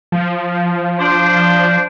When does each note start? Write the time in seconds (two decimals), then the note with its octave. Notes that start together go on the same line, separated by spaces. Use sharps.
0.12 F3
0.99 D4 C5